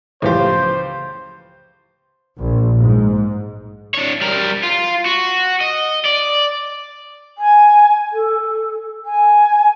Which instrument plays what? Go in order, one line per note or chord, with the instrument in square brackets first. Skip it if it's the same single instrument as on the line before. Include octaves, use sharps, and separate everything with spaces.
[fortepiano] C#2 B3 G4 [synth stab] A2 E3 F3 [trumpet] C5
[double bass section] A#1
G#2
[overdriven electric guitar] D4 C#5
G3 A#4
F4
F#4
D#5
D5
[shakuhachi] G#5
A4
G#5